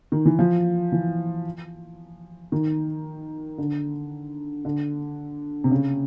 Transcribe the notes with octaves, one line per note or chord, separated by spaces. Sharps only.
D#3
E3
F3
E3
D#3
D3
D3
C3
C#3